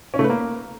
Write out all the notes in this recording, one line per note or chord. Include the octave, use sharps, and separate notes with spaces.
C#4
A3
B4
A#3